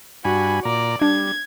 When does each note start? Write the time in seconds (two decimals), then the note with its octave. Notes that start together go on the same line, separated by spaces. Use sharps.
0.25 G2 F#4 G#5 B5
0.65 A#2 D5 A#5
1.01 G3 D4 G#6